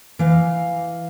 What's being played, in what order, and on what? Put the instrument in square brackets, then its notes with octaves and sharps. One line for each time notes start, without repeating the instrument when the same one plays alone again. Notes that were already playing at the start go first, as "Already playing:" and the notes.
[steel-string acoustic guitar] E3 F5